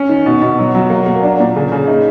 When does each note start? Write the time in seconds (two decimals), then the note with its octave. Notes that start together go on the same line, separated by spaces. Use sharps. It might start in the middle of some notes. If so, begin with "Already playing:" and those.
Already playing: C#4
0.09 D#3
0.26 B2
0.42 B2
0.59 F#3
0.75 F#3
0.90 A#3
1.06 A#3
1.23 D4
1.40 A#2
1.56 C#3
1.72 C#3
1.88 D#4